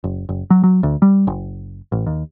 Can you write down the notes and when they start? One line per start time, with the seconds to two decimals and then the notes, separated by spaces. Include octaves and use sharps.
0.04 F#1
0.29 F#1
0.50 F#3
0.64 F#3
0.83 D2
1.02 G3
1.27 F#1
1.92 A1
2.07 D#2